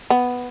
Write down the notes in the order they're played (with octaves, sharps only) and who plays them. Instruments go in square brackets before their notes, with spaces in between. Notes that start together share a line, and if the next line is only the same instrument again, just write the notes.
[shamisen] B3